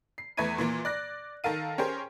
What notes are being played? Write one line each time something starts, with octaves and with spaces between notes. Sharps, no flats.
C7
E2 A3 B4 G#6 D#7
A#2 E3 A#3
D5 F#6 A#6
D#3 A4 A#4 F5 D#7
C#4 G4 G#4 A#4 C5